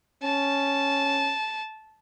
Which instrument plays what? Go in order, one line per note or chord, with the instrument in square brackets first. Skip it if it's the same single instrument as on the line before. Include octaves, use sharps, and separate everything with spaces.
[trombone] C#4 [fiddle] A5